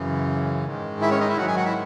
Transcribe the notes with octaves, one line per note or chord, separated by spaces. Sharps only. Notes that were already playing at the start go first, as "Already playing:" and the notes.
Already playing: F#2 C#3 E3
G#2 D#3 G#3
E4 E5
C#4 C#5
D#4 D#5
E4 E5
G#2 D#3 F#3 F#4 F#5
G#4 G#5
F#4 F#5
E4 E5